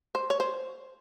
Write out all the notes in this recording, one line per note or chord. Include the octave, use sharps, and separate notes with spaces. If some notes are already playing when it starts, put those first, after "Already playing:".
C5
C#5
C5